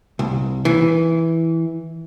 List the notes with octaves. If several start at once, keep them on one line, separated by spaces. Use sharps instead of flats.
C2
E3